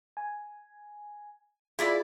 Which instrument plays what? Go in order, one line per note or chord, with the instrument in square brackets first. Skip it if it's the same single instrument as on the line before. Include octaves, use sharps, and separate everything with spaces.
[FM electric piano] G#5
[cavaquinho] E4 D5 B5 [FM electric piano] F4 G#4